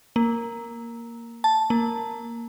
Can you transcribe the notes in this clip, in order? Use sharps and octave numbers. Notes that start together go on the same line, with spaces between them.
A#3
A5
A#3